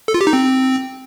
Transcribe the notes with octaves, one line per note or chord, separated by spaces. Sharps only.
A4
F4
G4
D#4
C4